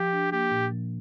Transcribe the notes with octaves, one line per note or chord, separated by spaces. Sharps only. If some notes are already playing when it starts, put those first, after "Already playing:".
Already playing: F3 G4
D4
A#3 G4
A#2
F3